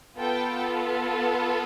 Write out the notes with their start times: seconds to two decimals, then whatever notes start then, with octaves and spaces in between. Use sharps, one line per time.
0.17 B3 F4 A4 G5